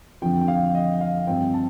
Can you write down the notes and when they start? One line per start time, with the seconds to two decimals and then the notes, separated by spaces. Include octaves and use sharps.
0.22 F2 D3 F3 G5
0.41 G5
0.48 F5
0.75 D#5
1.01 F5
1.27 G2 F3 C4 G5
1.54 A5